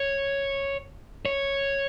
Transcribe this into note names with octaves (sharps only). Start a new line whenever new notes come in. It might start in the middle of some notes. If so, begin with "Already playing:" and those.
Already playing: C#5
C#5